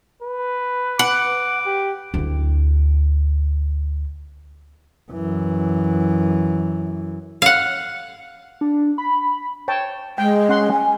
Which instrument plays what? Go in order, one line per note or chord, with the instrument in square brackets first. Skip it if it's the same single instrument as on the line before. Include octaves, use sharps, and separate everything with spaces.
[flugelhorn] B4
[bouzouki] F#5 [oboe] D6
[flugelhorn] G4
[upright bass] D2 E4
[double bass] F#2 E3
[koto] F5 F#5
[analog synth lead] D4
B5
[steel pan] C#5 G5 A5
[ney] G#3 [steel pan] G5
[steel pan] C#4 F#5 C6
[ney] G#5